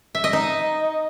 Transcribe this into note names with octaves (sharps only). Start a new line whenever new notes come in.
E5
D#5
D#4